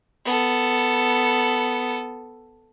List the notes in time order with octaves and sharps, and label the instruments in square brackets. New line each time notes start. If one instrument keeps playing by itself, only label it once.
[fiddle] B3 A4